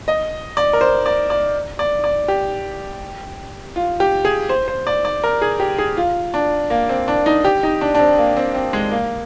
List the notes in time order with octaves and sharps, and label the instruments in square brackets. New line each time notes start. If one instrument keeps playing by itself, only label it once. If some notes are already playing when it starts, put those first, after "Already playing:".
[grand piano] D#5
D5
A#4
C5
D5
D5
D5
D5
G4
F4
G4
G#4
C5
C5
D5
D5
A#4
G#4
G4
G#4
F4
D4
A#3
C4
D4
D#4
G4
D#4
D4
D4
C4
A#3
C4
C4
G#3
A#3